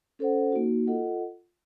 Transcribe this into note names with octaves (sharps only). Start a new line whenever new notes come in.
C#4 A4 C5 F#5
A#3 D#4 F#4
F4 A4 D#5 F#5